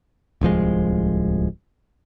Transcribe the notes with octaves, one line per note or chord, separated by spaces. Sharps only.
D1 C2 F3 G#3